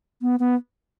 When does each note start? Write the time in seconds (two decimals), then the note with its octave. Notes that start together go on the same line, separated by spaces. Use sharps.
0.22 B3
0.40 B3